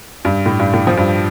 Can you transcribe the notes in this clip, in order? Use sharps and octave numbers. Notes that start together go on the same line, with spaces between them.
G2
A2
G2
A2
F3
G2